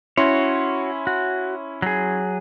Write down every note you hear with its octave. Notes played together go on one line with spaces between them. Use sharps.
C#4 E4 F#4 C#5 C6
F#4
F#3 G#4